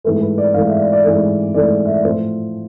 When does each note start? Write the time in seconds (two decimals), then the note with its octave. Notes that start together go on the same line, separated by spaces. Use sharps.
0.04 G#2 E3 A3 B4
0.21 B4
0.38 D5
0.54 G#2 E3 A3 F5
0.67 E5
0.79 D5
0.93 D5
1.04 G#2 E3 A3
1.54 G#2 E3 A3 D5
1.85 E5
1.92 D5
2.04 A2 F3 A3 C5